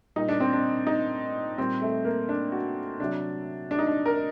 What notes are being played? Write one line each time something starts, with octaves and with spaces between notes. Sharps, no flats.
A#2 G3 D#4
D4
C4
D4
D#4
A#2 G3 C4
A3
A#3
D4
F#4
C3 F#3 D4
D4
D#4
D4
A#4